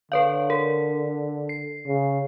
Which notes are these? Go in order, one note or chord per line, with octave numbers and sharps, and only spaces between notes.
D3 B4 C#5 F5
A#4
C7
C#3